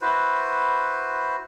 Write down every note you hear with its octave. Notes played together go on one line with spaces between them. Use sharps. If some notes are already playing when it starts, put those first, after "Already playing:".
E4 F#4 B4 C5